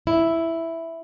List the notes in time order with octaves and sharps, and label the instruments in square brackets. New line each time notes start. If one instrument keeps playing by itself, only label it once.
[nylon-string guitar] E4